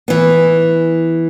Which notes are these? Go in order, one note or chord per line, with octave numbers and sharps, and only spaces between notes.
E3 B3